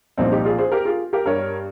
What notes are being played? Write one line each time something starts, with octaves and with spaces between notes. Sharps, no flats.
C2 A#2 F3 C4 D#4
D#4 G4
F4 G#4
G#4 C5
G4 A#4
F4 G#4
G4 A#4
G2 G3 A#4 C#5